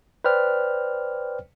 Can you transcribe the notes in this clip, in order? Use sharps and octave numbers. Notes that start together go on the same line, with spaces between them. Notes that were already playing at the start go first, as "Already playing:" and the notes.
B4 C5 D5 G5 F6